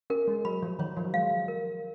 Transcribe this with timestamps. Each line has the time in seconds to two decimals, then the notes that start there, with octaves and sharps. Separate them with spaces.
0.10 C#4 A#4
0.27 G#3
0.45 F#3 B5
0.63 F3
0.79 D#3 C#5
0.97 F3
1.05 F#3
1.14 G#3 F5
1.48 A#4